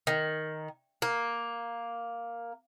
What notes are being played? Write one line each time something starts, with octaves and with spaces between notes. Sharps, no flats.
D#3
A#3